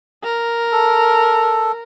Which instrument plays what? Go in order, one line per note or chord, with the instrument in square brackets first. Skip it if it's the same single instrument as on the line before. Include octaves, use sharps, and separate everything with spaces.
[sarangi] A#4
[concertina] A4